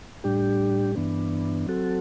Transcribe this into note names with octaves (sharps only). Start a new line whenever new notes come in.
A2 G3 D4 G4
G2 E3 B3 D4
F#3 C4 F#4 A4